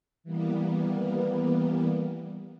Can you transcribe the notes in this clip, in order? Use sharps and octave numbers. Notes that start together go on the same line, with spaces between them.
E3 G3 A#3 B3